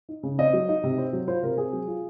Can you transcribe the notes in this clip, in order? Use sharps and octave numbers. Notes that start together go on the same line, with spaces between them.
D#4
C#3
C4 D#5
F#3
D#4
C3
C4
F#3
F4 C5
C3 A#4
C4 G#4
F#3
F4